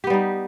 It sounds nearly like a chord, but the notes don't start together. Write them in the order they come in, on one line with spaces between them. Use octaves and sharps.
G4 B3 G3 D#4